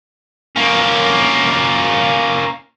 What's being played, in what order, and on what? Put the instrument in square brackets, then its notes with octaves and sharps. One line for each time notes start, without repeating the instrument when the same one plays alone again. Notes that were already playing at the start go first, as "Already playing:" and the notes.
[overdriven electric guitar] A#3 C#4